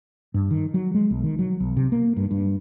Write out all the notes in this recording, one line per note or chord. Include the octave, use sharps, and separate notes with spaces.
G2
D#3
F#3
G#3
B1
D#3
F#3
B1
C3
A#3
G2
G2